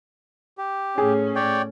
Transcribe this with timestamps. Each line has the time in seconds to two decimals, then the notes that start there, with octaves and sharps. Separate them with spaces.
0.58 G4
0.98 A2 C#4 G#4
1.35 C#5 D5 G5